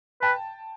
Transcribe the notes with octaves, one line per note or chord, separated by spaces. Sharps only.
B4 G5 A5